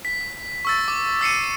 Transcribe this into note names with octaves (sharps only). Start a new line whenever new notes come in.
B6
C#6 E6 A6
D6
E6 C7 C#7 D#7